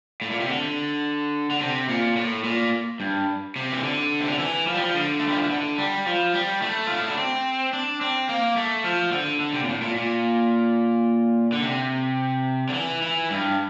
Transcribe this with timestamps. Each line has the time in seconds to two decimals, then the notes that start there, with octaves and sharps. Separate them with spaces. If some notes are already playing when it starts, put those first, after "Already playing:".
0.21 A2
0.30 A#2
0.40 C3
0.49 D3
1.50 D3
1.61 C3
1.89 A#2
2.16 A2
2.44 A#2
3.00 G2
3.56 C3
3.72 E3
3.84 D3
4.20 C3
4.30 D3
4.39 E3
4.67 F3
4.74 G3
4.81 F3
4.94 D3
5.19 A3
5.27 G3
5.35 F3
5.42 E3
5.50 D3
5.78 G3
6.06 F3
6.34 G3
6.62 A3
6.87 F4
6.97 E4
7.07 D4
7.18 C4
7.73 D4
8.01 C4
8.29 A#3
8.56 A3
8.84 F3
9.12 D3
9.40 D3
9.54 C3
9.64 A#2
9.68 A2
9.82 A#2
9.96 A#2
11.52 D3
11.63 C3
12.69 D3
12.74 E3
13.02 E3
13.30 G2